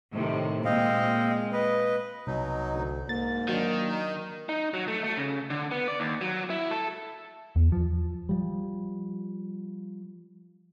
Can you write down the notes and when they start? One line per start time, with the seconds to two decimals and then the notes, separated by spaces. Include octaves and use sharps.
0.13 A2 C3 D#3
0.65 A#2 G#3 C4 D#5 F5
1.53 B4 D#5
2.27 C2 B2 F#3 D#4
2.74 D2
3.09 G#2 A#3 A6
3.48 D#3 F#3 D4
3.88 D#4
4.49 D#4
4.74 F#3
4.88 A3
5.04 A3
5.17 C#3
5.50 D3
5.71 B3
5.88 D5
6.00 D#2
6.21 F#3
6.50 E4
6.71 A4
7.56 E2
7.72 F3
8.29 F3 G3